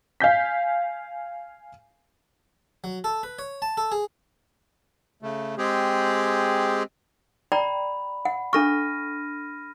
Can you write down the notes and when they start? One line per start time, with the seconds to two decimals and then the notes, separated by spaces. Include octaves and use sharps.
0.20 F5 G#5 G6 B6
2.84 F#3
3.04 A4
3.23 B4
3.39 C#5
3.62 A5
3.77 A4
3.92 G#4
5.22 C#3 A3
5.58 G#3 C4 G4 G#4
7.52 D5 G5 A#5 B5
8.25 F#5
8.53 D4 A4 C#6 F6 A#6 D#7